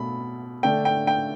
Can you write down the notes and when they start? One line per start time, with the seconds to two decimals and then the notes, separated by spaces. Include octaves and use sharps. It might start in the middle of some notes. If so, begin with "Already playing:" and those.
Already playing: B2 A3 B5
0.63 D3 A3 D4 G5
0.85 G5
1.07 G5